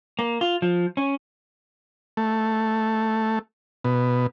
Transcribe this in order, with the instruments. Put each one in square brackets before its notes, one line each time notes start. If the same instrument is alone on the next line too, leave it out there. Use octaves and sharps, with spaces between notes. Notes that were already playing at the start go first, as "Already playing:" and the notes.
[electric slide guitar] A#3
F4
F3
C#4
[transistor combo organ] A3
B2